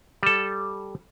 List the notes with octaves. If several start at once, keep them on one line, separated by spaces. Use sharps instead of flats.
G3 A4